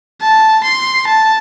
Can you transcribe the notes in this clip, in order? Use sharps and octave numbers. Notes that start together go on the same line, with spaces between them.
A5
C6
A5